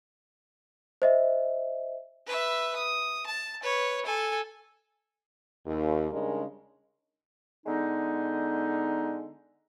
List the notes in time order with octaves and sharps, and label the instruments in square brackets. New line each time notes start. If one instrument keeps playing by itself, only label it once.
[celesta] C5 D#5 E5
[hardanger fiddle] B4 E5
D#6
A5
B4 C#5
A4 G#5
[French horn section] D#2
C#3 G3 G#3 D4 D#4 A#4
[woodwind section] D3 G#3 B3 D#4